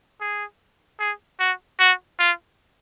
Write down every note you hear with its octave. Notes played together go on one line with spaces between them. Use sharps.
G#4
G#4
F#4
F#4
F4